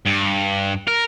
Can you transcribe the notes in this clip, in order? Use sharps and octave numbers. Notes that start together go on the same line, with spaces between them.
G2
A#4